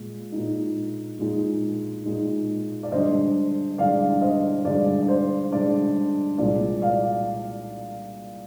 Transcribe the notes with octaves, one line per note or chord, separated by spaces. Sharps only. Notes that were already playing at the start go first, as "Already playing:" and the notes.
Already playing: A#2 G#3
A#2 G#3 D#4
A#2 G#3 D#4
A#2 G#3 D#4
D5
G2 D3 G#3 D4 C5 D#5
G2 D3 G#3 D4 D5 F5
C5 D#5
G2 D3 G#3 D4 D5
D5
C5
G2 D3 G#3 D4 D5
C2 A#2 G#3 D5
D5 F5